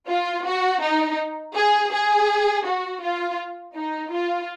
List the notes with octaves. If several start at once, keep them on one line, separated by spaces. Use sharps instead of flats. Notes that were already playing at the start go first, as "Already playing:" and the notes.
F4
F#4
D#4
G#4
G#4
F#4
F4
D#4
F4